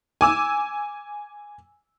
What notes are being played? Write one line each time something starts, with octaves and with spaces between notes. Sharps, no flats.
G#5 D6 E6